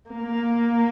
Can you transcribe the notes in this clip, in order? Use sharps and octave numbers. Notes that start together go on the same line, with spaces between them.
A#3